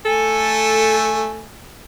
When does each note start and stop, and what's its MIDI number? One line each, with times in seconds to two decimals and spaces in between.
0.05 1.46 57
0.05 1.32 69
0.05 1.46 80